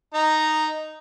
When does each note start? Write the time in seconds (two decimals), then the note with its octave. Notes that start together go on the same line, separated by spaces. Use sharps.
0.14 D#4 A#5